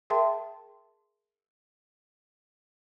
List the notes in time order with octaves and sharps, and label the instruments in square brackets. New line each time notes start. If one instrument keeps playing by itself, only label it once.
[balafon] G#4 A#4 E5 G5 A5 C6